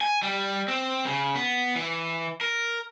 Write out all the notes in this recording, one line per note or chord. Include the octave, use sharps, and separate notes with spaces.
G#5
G3
C4
C#3
B3
E3
A#4